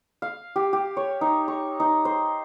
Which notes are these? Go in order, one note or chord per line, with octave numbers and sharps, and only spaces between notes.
F5
G4
G4
C#5
D#4
C#6
D#4
C5